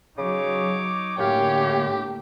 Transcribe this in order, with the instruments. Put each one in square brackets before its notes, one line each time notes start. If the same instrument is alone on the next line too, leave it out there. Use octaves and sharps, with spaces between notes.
[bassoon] C#3 [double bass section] F#3 [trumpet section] D#4 C#5 D6
[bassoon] F#2 [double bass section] A2 D3 A#3 [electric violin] G4 [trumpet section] C#5 F5